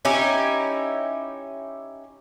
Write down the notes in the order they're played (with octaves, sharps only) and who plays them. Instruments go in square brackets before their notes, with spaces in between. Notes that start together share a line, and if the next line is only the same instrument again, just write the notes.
[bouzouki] C#4 D#4 E4 G4